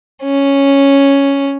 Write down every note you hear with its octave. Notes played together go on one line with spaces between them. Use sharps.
C#4